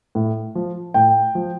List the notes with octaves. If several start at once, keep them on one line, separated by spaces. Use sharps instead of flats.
A2
F3
A2 G5
F3